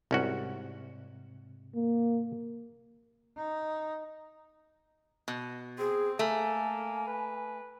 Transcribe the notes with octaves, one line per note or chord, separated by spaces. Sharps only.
C2 G#2 C3 C#4 F#4
A#3
D#4
B2
C4 G#4
A3 A#3 G#5
B4